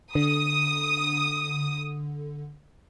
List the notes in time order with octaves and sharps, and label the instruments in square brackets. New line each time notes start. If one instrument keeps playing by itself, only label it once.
[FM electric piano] D3 [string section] D#6